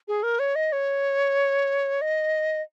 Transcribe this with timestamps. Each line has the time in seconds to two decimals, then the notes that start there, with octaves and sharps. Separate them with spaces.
0.08 G#4
0.23 A#4
0.39 C#5
0.55 D#5
0.72 C#5
2.01 D#5